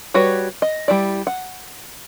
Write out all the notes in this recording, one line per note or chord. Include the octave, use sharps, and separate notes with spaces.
G3 F#4 B4 C#5
D#5
G3 E4 D5
F#5